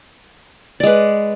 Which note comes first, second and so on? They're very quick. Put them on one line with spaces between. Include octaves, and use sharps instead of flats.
D5 G#3 B4